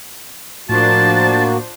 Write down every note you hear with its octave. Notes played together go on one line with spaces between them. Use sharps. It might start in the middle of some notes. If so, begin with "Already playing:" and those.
A2 F3 A#3 D4 F#4 C5 A5